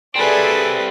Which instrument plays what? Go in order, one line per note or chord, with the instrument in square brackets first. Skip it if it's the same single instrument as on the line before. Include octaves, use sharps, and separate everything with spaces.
[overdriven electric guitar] G3 C4 [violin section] G#4 D5 E5 [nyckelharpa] A4 B4